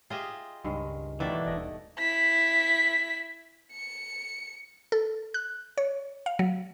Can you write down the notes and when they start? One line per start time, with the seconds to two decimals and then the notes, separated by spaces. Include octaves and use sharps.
0.10 F4 G4 G#4 D#5 E5
0.64 C#2 G2 D#3 G#3
1.20 B2 D#3 E3 A3 D4 E5
1.46 D#1 D5 D#5
1.99 E4 B6
3.73 C#7
4.92 A4
5.34 F#6
5.78 C#5
6.26 F5
6.39 F#3